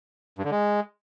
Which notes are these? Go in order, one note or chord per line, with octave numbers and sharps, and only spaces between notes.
G2
D3
G#3